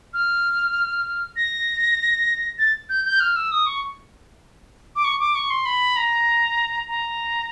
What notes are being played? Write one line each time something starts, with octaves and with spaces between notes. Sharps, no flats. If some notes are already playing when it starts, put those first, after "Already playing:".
F6
A#6
A6
G6
G6
F6
E6
D#6
C#6
D6
C#6
D6
C#6
C6
B5
A#5
A#5